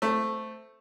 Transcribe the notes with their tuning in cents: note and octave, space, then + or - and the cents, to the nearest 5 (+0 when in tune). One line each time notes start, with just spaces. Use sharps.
A3 +0 C4 -5